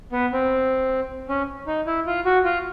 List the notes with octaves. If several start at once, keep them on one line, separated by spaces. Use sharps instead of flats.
B3
C4
C#4
D#4
E4
F4
F#4
F4